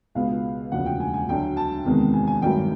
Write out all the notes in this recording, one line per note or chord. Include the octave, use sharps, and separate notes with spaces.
C#2 B2 G#3 B3 F5
E1 D2 C#3 F3 A#3 F#5
G5
G#5
G#5
D2 D3 F#3 A3 G5
A5
E2 C3 D#3 G#3 B3
G#5
G#5
G#1 G2 D#3 F#3 A3 G5